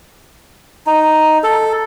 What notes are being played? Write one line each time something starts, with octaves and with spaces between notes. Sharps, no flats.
D#4
A4